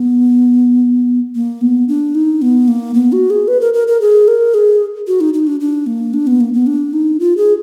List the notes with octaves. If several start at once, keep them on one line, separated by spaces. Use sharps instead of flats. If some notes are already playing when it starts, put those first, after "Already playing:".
Already playing: B3
A#3
B3
D4
D#4
B3
A#3
B3
F#4
G#4
B4
A#4
A#4
A#4
G#4
A#4
G#4
F#4
D#4
D#4
D4
D4
A#3
D4
B3
A#3
B3
D4
D#4
F4
G#4